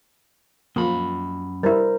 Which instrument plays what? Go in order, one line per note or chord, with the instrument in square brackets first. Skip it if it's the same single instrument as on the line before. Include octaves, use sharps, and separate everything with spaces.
[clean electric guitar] F#2 B5 [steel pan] F3 A#3
[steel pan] G3 E4 [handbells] A#4 C5 A#5